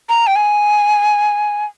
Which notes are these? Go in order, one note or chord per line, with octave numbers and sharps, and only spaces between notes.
A#5
G5
G#5